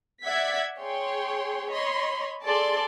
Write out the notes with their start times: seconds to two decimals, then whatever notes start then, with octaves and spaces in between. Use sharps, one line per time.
0.23 D5 E5 F#5 G#6 B6
0.81 G#4 C#5 G5 C6
1.69 C#5 D#5 B5 C6
2.43 G#4 A4 D5 A5 C6